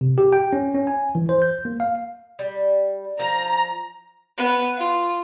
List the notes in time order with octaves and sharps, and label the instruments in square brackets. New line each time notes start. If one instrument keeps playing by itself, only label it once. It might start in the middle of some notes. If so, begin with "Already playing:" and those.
[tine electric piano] C3
G4
G5
C#4
C#4
G#5
E3
C5
G6
A#3
F5
[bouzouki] G3
[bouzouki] F3 [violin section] A#5
[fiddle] B3
F4